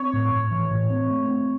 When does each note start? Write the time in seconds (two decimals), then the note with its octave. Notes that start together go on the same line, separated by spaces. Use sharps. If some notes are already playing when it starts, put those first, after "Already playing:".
Already playing: C4 C#5
0.13 A2
0.32 A2
0.51 E3
0.71 A2
0.90 C4
1.10 A3
1.28 C4